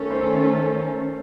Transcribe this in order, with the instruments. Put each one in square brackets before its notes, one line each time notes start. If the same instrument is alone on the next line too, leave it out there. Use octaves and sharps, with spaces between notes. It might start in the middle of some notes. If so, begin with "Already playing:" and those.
Already playing: [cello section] D#3 A3 C#4 A4 [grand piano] A#4
[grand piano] C5